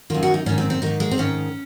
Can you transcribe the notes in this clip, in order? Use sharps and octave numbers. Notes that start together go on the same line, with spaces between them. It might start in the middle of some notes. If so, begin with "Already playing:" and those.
F#2 D#3 F4
F#4
D#4
G#2 D#3 C#4
C4
C4
G#2 D#3 D#4
G#3
C4
G#2 D#3 C#4